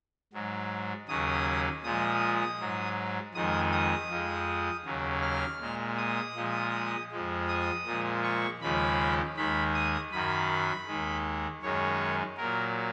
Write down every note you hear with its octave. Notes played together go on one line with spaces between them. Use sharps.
G#2 F#3
D#2 C#3 F#3 D#6
A#2 F3 G#3 D#6
G#2 F#3
F2 D#3 G#3 D#6
D#6
F2 F3 G#3
D#2 C#3 F#3
F6
A#2 G#3
D#6
A#2 F3 G#3
F2 F3 G#3
D#6
A#2 F3 G#3
C#6
D#2 C#3 F3 G#3 B5
D#2 D#3 G#3 B5
D#6
F#2 D#3 F#3 B5
D#2 D#3 G#3
F#2 D#3 G#3 C#5
A#2 F#3 A#4